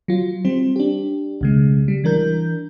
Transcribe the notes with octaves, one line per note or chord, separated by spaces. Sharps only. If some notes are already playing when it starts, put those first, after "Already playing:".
F#3 F4
G3 C4 C5
D4 G4
B1 C#3 G#3
G3
E3 D4 A#4 G6